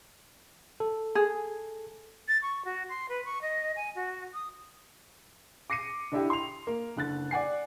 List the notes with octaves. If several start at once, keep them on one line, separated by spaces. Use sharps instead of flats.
A4
G#4
A6
C#6
F#4
C6
B4
C#6
D#5
G#5
F#4
D#6
D6 A#6 C7 C#7 D#7
D3 D4 E4 G4
C6 F7
A#3
F#1 D3 F#6 A6
D5 F#5 G#5 C7